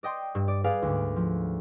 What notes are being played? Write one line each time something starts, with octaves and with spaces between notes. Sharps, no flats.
D5 D#5 G5 C6
G2
D5
G#4 B4 D5 F5 G#5
D2 G#2
F3